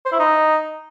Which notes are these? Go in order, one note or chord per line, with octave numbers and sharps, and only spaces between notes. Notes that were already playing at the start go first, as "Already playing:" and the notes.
C5
E4
D#4